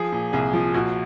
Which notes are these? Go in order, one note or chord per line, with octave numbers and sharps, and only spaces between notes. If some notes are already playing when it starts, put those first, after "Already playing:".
Already playing: F3 G#4
A#2
C2 G#4
F3
A#1 F#4